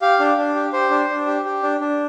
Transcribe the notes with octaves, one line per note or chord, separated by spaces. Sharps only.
G4 F5
D4
D4
G4
G4 C5
D4
D4
G4
G4
D4
D4